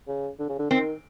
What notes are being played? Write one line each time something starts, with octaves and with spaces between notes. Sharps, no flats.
C#3
D3
C#3
D3
D#3 C4